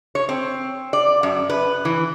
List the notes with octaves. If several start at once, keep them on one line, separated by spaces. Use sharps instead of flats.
C#5
C4
D5
F#2
B4
E3